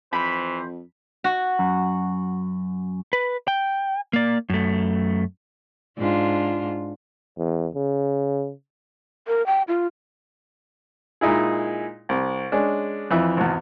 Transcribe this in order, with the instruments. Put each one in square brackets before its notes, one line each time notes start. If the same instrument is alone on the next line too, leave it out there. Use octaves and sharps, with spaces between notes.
[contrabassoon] F2 [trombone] E3 [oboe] C5 [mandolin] B5
[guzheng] F#4
[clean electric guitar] F#2
[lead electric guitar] B4
G5
A#3 D5
F#2 A3
[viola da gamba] G#2 D4 F4
[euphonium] E2
C#3
[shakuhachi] A#4
G5
F4
[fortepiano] A#2 G#3 D#4 E4 G#4
C2
G#3 C#4 D4
F2 E3 E5
G#1 E2